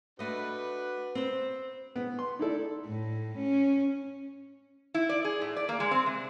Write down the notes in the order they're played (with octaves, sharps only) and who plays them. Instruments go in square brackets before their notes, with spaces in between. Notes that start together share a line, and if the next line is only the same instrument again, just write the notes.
[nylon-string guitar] A3 D#5 [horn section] D4 F#4 B4
[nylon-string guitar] C4 C5
[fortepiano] B3
C6
D#4 E4 A4 D5
[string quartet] A2
C#4
[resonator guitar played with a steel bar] E4
D5
G#4
A2
D5
A#3
G#3
C4
C3